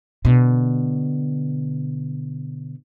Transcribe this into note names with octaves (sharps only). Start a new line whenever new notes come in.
B2 D3